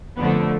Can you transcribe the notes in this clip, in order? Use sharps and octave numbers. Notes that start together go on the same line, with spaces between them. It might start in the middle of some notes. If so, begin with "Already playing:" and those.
F2 D3 F3 A3 B3